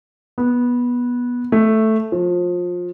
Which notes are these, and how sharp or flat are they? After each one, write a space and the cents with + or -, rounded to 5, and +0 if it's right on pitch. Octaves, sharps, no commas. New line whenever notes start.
B3 -15
A3 +0
F3 +25